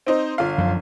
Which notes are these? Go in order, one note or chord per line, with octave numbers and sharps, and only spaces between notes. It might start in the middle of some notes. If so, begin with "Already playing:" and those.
C4 D#4 C5
G1 F4 F5
F#2 F3